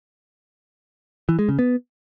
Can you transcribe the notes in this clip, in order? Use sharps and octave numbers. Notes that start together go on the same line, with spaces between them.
E3
G#3
C#3
B3